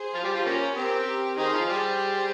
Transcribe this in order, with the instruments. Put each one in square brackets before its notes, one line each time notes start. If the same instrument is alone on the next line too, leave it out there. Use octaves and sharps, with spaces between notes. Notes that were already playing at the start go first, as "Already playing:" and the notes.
Already playing: [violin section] G#4 C5
[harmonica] F3 F4
G3 G4
F3 F4
[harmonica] F3 A#3 C#4 [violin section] G4 A#4
[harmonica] C4 [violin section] G4 A#4
[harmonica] D#3 D#4 [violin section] G#4 C5
[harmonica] F3 F4
[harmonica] G3 G4 [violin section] G#4 C5